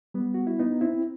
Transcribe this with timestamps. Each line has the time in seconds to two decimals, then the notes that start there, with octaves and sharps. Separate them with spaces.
0.14 G3 B3
0.34 F#4
0.47 E4
0.59 B3 D#4
0.81 C4 E4